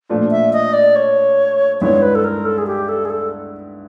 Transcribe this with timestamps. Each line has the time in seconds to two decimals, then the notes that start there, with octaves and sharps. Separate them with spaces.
0.09 A#2 F3 A3 D4 F4
0.31 E5
0.53 D#5
0.73 D5
0.96 C#5
1.81 G2 D#3 G#3 B3 E4 C#5
2.02 B4
2.15 A4
2.24 A#4
2.45 A4
2.58 G#4
2.67 G4
2.89 A4
3.05 G#4
3.10 A4